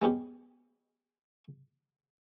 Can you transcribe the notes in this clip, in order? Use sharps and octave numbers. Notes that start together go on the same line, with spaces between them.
G#3 B3 C#4 G4